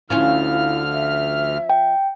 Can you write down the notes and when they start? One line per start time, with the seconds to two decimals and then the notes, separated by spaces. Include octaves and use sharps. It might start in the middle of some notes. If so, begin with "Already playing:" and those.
0.10 D2 F3 C#4 E4 F4 F6
0.92 E5
1.70 G5